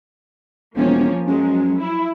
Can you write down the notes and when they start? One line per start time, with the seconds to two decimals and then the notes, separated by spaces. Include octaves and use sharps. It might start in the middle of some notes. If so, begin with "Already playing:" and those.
0.76 E1 F3 A#3 C#4
1.27 F#2 F3 F#3 G#3
1.79 E4